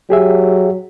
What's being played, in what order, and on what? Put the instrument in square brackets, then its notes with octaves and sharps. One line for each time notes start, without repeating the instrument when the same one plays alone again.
[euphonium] F#3 [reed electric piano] G4 G#4 E5